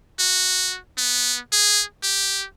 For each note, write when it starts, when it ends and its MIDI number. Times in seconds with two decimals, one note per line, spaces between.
0.19 0.78 66
0.98 1.39 59
1.52 1.83 68
2.03 2.45 67